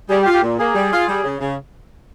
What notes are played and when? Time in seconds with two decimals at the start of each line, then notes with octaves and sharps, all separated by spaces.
0.09 G3 G#4
0.22 G4
0.26 F4
0.33 G4
0.42 A#2
0.59 A#3 G#4
0.75 G3
0.92 F4
1.08 G3
1.24 C#3
1.40 C#3